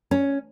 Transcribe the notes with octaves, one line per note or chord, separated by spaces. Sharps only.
C#4